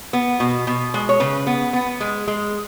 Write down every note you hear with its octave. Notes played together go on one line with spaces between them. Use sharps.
B3
B2
B2
G#3
C#5
C#3 B4
B3
B3
G#3
G#3